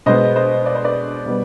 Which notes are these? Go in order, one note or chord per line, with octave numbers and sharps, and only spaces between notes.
B2 G#3 B3 C5 D#5
C5 D#5
D5
C5
B4 D5
B2 G3 B3